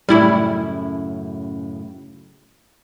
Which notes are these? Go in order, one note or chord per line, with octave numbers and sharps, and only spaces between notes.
F#2 A2 C#3 G3 E4